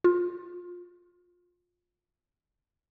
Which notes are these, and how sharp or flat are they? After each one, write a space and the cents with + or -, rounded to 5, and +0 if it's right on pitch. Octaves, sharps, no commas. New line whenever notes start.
F4 +20